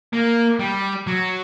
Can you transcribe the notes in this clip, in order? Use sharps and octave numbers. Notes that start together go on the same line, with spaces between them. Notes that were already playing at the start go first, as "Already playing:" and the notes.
A#3
G3
F#3